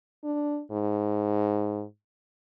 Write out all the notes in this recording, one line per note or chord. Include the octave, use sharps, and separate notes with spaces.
D4
G#2